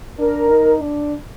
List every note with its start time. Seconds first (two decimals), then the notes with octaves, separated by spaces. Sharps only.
0.18 D4 A#4
0.50 D#4
0.81 D4